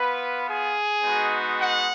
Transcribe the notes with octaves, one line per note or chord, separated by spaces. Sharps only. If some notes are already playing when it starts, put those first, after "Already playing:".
Already playing: B3 F4 B4
G#4
G#3 B3 D#4 F#4
F#5